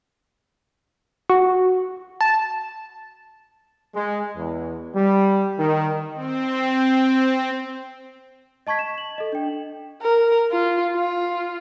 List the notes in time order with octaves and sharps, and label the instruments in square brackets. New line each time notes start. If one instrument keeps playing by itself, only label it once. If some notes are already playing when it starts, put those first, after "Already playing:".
[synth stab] F#4
A5
[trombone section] G#3
E2
G3
D#3
[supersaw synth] C4
[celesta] D#5 A5 C#6 G#6 B6
E7
F#7
A4 D#5
D4 G5
[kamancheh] A#4
F4
F4